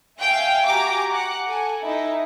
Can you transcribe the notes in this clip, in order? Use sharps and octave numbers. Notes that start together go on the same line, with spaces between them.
E5 F5 G5 G#5
F#4 G4 G#5 A#5 D6
F#5
A4 G#5
D#4 E4